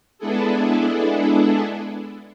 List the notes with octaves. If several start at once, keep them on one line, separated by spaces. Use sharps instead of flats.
G#3 B3 D4 E4 G#4 A4